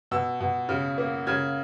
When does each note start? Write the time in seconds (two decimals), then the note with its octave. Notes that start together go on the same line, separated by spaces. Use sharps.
0.11 B2 E6
0.40 B2
0.69 C#3
0.98 A#3
1.27 C#3 G#6